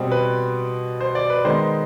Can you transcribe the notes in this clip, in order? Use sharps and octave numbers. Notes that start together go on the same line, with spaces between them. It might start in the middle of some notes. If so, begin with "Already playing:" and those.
Already playing: B2 G3 C4 C5
B4
C5
D5
B4
D#3 G#3 B3 C5